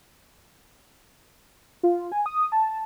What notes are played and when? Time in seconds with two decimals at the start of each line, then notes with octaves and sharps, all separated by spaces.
1.83 F4
2.12 G#5
2.26 D#6
2.52 A5